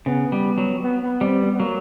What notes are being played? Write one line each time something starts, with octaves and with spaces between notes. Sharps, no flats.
C#3 B3
G3
F#3
B3
B3
G3 C4
B3
B3
F#3 A#3